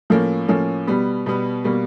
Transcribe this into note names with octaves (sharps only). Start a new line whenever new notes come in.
A2 F3 A#3 C#4
A2 F3 A#3 C#4
B2 G3 B3
B2 G3 B3
B2 G3 A#3